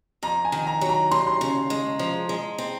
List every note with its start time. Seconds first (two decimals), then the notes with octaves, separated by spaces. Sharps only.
0.23 F2 A#5
0.45 G#5
0.52 D#3
0.67 A#5
0.81 F#3
0.89 A#5
1.11 D#2 C6
1.27 C6
1.41 C#3
1.70 G#3
1.99 F3
2.29 G#3
2.58 C4